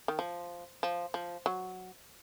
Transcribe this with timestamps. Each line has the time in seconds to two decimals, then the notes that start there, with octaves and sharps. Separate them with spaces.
0.08 D#3
0.19 F3
0.83 F3
1.14 F3
1.46 F#3